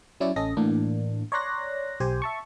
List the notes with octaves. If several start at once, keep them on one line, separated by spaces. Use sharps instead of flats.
F#3 C#4 E4 C#5 D5
A1 C#4 A4 D#5 A#6
A2 E3 A#3 D4
C#5 D5 A#5 C6 F#6 A#6
B1 G4 C5 G#5
E5 A5 C#6